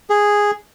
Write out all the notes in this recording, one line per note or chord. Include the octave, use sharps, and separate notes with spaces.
G#4